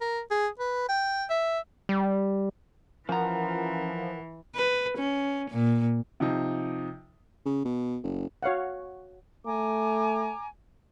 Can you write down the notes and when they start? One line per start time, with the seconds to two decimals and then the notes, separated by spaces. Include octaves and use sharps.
0.01 A#4
0.31 G#4
0.59 B4
0.89 G5
1.30 E5
1.89 G3
3.09 E3 F3 C#4 A#4 F#5 A#5
4.55 B4
4.98 C#4
5.51 A#2
6.20 C3 F3 D#4
7.46 C#3
7.65 B2
8.03 F#1
8.43 F#4 C#5 F5 F#5
9.45 A3 G#5 A#5 D6